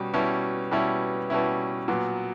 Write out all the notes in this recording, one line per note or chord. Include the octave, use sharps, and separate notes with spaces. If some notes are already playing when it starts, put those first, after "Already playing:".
Already playing: B2 G3 C#4
B2 G3 C#4 E4
B2 G3 C#4 E4
B2 G3 C#4 E4
A#2 F#3 B3